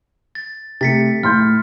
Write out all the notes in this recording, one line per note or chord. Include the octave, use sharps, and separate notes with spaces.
A6
C3 A3 A6 B6 C#7
A2 C6 F6 G6